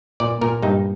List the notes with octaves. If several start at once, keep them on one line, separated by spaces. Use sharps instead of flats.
A#2 D5
A#2 A#4
G2 D#4